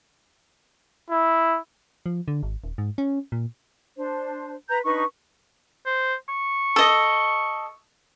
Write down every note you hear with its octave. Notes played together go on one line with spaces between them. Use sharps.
E4
F3
D3
G#1
D#1
G#2
C#4
A#2
D4 C5
B4 A#5 G6
D4 D#4 B4 C#6
C5
C#6
A4 D#5